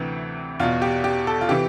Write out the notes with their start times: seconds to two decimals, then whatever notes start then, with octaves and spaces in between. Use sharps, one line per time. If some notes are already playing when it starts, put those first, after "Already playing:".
Already playing: D2 C3 E3
0.60 E2 F4
0.63 B2
0.82 G4
1.04 G4
1.27 A4
1.41 F4
1.49 C3 E3 G4